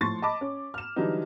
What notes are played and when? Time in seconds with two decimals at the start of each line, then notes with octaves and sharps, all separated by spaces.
0.01 A2 F3 C6 C#6 A6
0.22 D#5 A5 B5 D6
0.41 C#4
0.74 F6 E7
0.96 D3 E3 F#3 G3 D#4